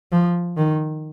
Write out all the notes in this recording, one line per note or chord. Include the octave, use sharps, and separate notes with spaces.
F3
D#3